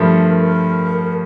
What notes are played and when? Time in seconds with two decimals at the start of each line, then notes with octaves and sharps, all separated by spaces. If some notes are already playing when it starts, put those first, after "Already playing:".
Already playing: G2 F3 A3 A#4
0.42 A#4